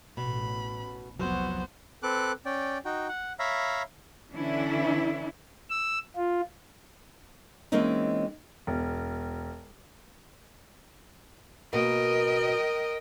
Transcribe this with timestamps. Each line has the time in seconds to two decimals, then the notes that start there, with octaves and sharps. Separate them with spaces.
0.17 A1 B2 B5
1.19 F1 C2 F3 F#3 B3 F#4 C5
2.03 C4 A4 B4 D6 F#6
2.45 C#4 D5 G5
2.85 D#4 F#4 G5
3.09 F#5
3.39 C#5 E5 F5 A#5 B5
4.33 D3 E3 C#4 D4 E4
5.70 E6
6.16 F4
7.72 E3 G#3 A#3 C4 C#4 D#4
8.67 E1
11.73 B2 A#3 A#4 D#5 G5